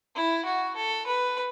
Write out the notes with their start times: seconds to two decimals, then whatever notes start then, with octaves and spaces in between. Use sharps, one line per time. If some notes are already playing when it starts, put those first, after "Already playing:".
0.15 E4
0.45 F#4
0.76 A4
1.07 B4